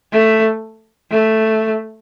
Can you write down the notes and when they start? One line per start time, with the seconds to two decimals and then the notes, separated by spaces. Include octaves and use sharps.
0.13 A3
1.11 A3